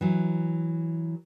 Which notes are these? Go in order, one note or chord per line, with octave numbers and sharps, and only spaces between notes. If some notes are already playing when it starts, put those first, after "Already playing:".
E3 F#3